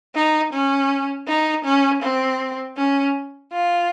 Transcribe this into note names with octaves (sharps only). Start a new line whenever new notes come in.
D#4
C#4
D#4
C#4
C4
C#4
F4